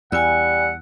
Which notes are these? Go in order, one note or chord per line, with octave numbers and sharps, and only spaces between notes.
E2 G3 F#5 G#5 E6